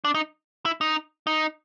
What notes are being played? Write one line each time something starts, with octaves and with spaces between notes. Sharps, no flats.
D4
D#4
E4
D#4
D#4